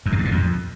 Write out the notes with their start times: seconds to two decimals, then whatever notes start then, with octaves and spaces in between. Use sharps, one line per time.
0.06 F#2
0.12 B2
0.19 G2
0.25 A#2
0.31 F2